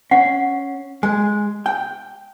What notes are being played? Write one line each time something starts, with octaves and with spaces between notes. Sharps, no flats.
C#4 F#5
G#3 G#5
G5